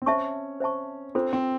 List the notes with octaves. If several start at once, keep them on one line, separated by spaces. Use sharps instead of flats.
C4
C#4 C5 E5 A5 C#6
C5 E5 A5 C#6
C4 D4 F4 A4 C5
C4